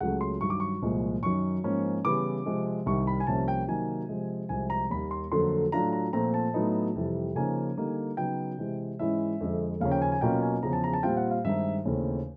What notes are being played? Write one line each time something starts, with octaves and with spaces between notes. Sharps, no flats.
C#2 C#3 F#3 A3 F#5
C6
G2 D#3 F#3 C#6
D6
C#6
C2 A#2 F3 G#3
F#2 D#3 F#3 C#6
G#2 F3 A#3 C#4
C#3 E3 G3 B3 E4 D6
C3 F3 G#3 C4
C2 C3 D#3 G3 C#6
B5
G#5
C2 C3 F3 A#3 C#4 A5
G5
C3 D#3 F#3 A#3 G#5
C3 F3 G#3
C2 C3 F3 G#3 G#5
A#5
D#2 D#3 G3 A#3 B5
C6
F2 D3 F#3 A#3 C6
A2 F#3 A3 D4 F4 A#5
A#5
A#2 F3 A3 C4 F4 A#5
A5
A2 F#3 B3 D#4
F2 C3 E3 G3
C#3 F3 A#3 D#4 G#5
D3 G3 A#3 D#4
C#3 F#3 B3 D#4 G5
C3 E3 G#3
G#2 E3 G#3 C#4 E4 E5
F2 D3 F3 G#3 C4
D#2 C#3 F3 A#3 C#4 F5
G5
G#5
G#5
B2 F#3 A#3 C#4 F4 G5
G#5
E2 C#3 F3 A#5
A5
A#5
A5
A#2 G3 C4 F4 G5
F#5
F5
G2 D#3 G#3 C4 D#4 E5
D#2 C#3 E3 A3 C4